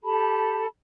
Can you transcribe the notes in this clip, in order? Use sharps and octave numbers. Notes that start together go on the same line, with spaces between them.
G4 A4 A5 B5